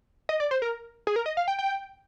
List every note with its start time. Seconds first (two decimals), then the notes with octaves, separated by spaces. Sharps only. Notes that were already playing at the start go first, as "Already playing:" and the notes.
0.29 D#5
0.40 D5
0.51 C5
0.62 A#4
1.07 G#4
1.16 A#4
1.26 D#5
1.37 F5
1.48 G5
1.59 G5